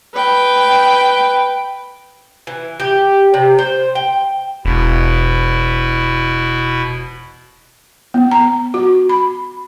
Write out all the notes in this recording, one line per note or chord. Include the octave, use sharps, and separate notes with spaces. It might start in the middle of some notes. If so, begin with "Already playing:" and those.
B4 G5
E3
G4
C3
C5
G5
E1 B2 E4
B3
A#5
F#4
B5